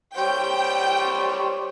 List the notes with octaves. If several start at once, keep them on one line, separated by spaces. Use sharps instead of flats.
G3 C5 C#5 G5